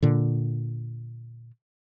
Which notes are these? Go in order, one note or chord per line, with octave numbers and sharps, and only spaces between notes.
A#2 D3